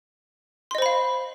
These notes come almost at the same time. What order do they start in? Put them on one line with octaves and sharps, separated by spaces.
C6 D#5 C5 B5 F5